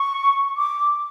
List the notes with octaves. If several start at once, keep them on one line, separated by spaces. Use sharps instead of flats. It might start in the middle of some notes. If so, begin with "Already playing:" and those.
Already playing: C#6
D6